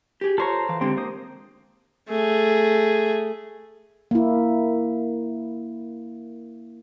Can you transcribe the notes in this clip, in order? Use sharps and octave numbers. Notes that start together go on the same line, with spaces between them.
G4 G#4
F4 A4 C5 C#5 A#5
E3 F5
D3 G#3 C4 G4
A#3 C5 D#6
A3 G#4
A#3 E4